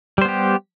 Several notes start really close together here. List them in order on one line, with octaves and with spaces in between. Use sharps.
G3 C5 B3 G4